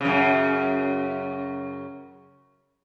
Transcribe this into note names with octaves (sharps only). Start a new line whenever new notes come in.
F#2 C#3